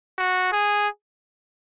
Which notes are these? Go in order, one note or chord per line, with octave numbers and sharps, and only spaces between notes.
F#4
G#4